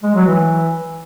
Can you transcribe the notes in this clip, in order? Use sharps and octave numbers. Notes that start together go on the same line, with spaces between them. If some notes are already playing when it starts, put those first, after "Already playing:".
G#3
F#3
E3